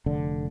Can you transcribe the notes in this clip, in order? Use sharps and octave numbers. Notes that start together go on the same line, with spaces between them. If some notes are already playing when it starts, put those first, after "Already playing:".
F1 D3